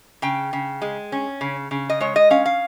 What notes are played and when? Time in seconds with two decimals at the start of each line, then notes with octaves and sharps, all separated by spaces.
0.22 C#3 G5
0.53 C#3
0.82 G#3
1.12 C#4
1.41 C#3
1.71 C#3
1.90 D#5
2.01 G#3 C#5
2.16 D#5
2.30 C#4 F5
2.46 F5